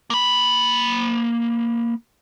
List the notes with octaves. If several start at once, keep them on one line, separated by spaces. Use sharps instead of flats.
A#3 B5